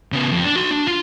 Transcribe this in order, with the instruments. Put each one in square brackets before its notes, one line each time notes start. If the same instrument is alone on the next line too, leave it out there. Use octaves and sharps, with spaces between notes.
[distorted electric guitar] C#3 B3
F2
D4
F#4 C6
D4
F4